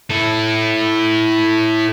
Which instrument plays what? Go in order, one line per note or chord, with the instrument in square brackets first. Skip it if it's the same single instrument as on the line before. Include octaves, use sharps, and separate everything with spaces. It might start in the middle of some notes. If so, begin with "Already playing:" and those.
[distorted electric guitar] E4 A4